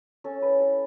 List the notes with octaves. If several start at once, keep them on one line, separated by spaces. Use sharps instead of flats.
C#4 A4
B4
E4
A4